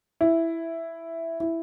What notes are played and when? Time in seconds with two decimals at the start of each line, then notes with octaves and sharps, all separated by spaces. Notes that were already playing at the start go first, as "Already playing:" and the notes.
0.21 E4
1.40 E4